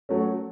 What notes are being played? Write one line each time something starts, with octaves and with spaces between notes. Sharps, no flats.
F#3 A3 C#4